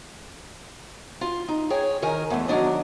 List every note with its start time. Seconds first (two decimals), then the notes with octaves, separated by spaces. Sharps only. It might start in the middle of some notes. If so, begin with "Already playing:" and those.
1.21 F4
1.48 D#4
1.70 G#4 C#5 G5
2.02 D#3 A#4 G#5
2.30 E2 A3
2.48 D#3 F#3 C4 D4 D#5